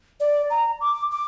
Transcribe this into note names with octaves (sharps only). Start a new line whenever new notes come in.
D5
A#5
D6
D6